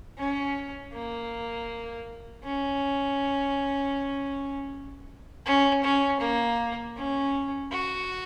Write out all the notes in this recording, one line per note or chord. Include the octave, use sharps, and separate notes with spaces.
C#4
A#3
C#4
C#4
C#4
A#3
C#4
F#4